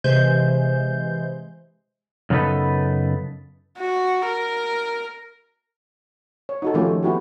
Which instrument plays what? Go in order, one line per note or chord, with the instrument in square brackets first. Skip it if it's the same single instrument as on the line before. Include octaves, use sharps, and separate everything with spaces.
[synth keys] C3 E3 G#3 C5 G6
[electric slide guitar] F#2 C#3 B3 D#4 A4 B4
[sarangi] F#4
A#4
[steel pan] C#5
D#4 F#4 A4
D#3 F3 A3 C#4 F4 G4
B3 E4 F#4 G4